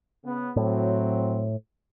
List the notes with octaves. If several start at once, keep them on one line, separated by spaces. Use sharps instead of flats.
C#3 B3
A2 F#3 C4